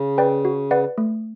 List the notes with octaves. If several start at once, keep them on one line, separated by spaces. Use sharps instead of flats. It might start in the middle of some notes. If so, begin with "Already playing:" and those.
Already playing: C#3
B4 D5 G5
F#4
B4 D5 F#5
A3